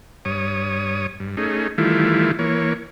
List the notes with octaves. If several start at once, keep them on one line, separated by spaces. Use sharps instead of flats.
G2 C#5 D#6
G2
A3 C#4 D#4 G#4
D#3 E3 G3 A3 E4 F4
E3 A#3 C#5